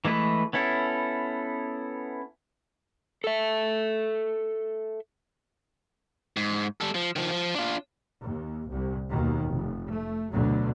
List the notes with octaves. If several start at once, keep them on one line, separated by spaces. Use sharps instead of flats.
E3 G#3 A3 B4
B3 C#4 E4 A4
A4 E5
G#2
G3 A4
F3
D#3 F3
F3
D4 F4
D#2
C2
D#2 B2 D#3
F1
A3
D2 B2 D3 F#3